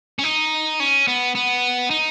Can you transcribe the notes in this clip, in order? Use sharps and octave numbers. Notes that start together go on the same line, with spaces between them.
C#4
D#4
C#4
B3
B3
D#4